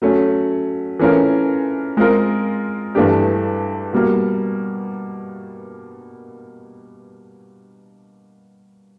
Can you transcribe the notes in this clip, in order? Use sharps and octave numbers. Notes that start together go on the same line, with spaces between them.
F#3 A3 C#4
E3 A3 C#4 F4 A#4
G#3 C4 F4 A#4
G2 E3 A3 D4 G4
B2 G3 A#3